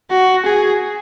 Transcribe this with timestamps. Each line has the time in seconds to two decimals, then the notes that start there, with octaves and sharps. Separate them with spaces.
0.11 F#4
0.45 G#4